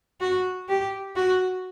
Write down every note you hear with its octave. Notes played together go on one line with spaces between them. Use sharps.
F#4
G4
F#4